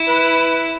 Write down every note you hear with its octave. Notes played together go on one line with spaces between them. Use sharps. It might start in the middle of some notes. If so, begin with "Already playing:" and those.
Already playing: E4
B4